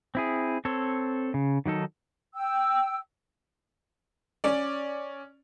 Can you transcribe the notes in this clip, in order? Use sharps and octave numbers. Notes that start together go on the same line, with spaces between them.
C4 E4 G#4
C4 A4 C#5
C#3
D#3 F#3 D#4 A4
G5 E6
C#4 D5